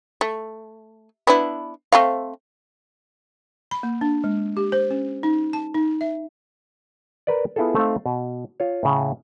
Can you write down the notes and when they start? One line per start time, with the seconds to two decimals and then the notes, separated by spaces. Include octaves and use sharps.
0.21 A3
1.27 B3 D4 E4
1.92 A3 C4 F5
3.71 B5
3.83 A#3
4.01 D4
4.24 G#3
4.57 G4
4.72 C5
4.90 C#4
5.23 D#4
5.53 A5
5.74 D#4
6.01 E5
7.27 A#4 B4 D5
7.56 B3 E4 F4 G#4 A4
7.75 A3 C4 D#4 F5
8.06 B2
8.60 F4 C#5
8.83 A2 C#3